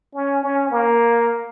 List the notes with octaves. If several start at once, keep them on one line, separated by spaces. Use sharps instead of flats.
C#4
C#4
A#3